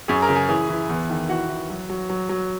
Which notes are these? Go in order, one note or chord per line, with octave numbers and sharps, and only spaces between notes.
F#2 G#4 G#5
A#4 A#5
C#3
G#4 G#5
E3 G#4 G#5
E3
E2
D#3
E3 F#4 F#5
E3
F#3
F#3
F#3
F#3